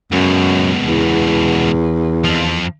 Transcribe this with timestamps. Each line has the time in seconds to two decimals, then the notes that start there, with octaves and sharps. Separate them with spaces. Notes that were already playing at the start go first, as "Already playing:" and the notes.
0.12 C#2 F#2 B2
0.83 E2
2.25 F2 F3